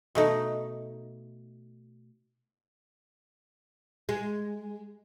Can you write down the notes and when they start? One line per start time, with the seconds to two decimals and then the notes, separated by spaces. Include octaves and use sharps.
0.15 B2 A3 D#4
4.09 G#3